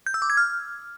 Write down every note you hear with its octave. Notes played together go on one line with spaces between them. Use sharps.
G6
E6
D6
G#6
F6